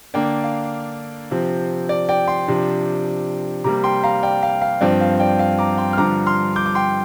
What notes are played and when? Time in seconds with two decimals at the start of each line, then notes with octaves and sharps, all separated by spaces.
0.14 D3 A#3 D4 D5 G5
0.44 F5
1.31 C3 F3 C4
1.89 D5
2.09 D5 G5
2.28 G5 C6
2.47 C3 F3 D4
3.64 C3 G3 A#3 A#5 D6
3.84 G5 C6
4.03 F5 A#5
4.23 D5 G5
4.43 F5
4.62 F5
4.81 G2 F3 C4 D5
5.01 F5
5.19 D5 G5
5.39 F5
5.59 A#5 D6
5.78 G5 C6
5.93 F6
5.98 G2 D3 F3 A#5 D6
6.27 C6 F6
6.56 D6 G6
6.66 D6
6.75 G5 C6